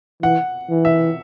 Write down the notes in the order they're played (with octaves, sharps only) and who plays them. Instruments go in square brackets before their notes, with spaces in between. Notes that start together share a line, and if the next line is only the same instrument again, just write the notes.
[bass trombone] E3 [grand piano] F#5
[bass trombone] E3
[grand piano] E5